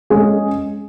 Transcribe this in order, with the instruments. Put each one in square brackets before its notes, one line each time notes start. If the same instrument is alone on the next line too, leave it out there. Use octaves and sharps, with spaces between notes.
[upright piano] G#3 C#4 G#4